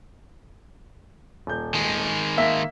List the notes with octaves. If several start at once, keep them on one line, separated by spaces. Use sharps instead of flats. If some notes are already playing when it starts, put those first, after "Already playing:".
D#1 G6
D#3 G#3
A#3 E5